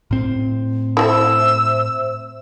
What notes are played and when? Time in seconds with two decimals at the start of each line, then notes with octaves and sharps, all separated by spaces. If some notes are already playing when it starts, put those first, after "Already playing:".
0.11 A2 C4
0.97 A3 D#4 E4 C5 E5 E6